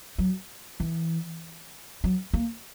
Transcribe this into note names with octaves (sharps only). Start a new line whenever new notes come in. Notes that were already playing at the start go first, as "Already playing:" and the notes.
F#3
E3
F#3
A#3